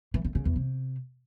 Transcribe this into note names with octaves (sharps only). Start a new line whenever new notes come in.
E3
D3
C#3
E2
C3